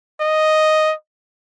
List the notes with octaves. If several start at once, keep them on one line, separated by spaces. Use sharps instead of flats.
D#5